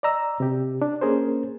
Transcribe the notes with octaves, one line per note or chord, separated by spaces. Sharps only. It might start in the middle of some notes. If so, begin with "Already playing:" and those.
D5 D#5 A#5 E6
C3 G4
D4
A#3 C#4 G#4 A#4 C5